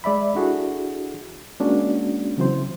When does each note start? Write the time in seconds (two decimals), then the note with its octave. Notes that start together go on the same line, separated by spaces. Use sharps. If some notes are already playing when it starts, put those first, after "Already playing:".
0.04 G#3 D5 E5 B5
0.35 D4 E4 F#4 G#4 A4
1.60 G#3 A#3 C#4 D4 F#4
2.37 C#3 E3 F#3 C4 E4 C5